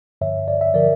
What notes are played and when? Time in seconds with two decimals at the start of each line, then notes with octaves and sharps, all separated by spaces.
0.21 G2 D3 F3 C#5 E5
0.48 D5
0.61 E5
0.74 D3 F3 A#4 D5